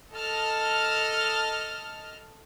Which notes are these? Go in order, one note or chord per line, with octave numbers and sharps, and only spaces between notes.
A4 D#5 A5 F6